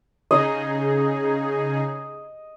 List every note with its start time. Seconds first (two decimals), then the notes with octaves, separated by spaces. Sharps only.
0.31 C#3 D#4 G#4 D#5